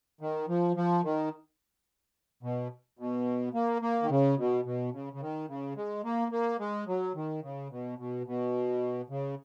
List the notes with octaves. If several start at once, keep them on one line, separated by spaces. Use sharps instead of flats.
D#3
F3
F3
D#3
B2
B2
A#3
A#3
D#3
C#3
B2
B2
C#3
C#3
D#3
C#3
G#3
A#3
A#3
G#3
F#3
D#3
C#3
B2
B2
B2
C#3